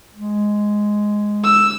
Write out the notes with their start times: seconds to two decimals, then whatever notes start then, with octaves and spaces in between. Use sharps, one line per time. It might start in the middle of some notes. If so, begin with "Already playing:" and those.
0.14 G#3
1.44 E6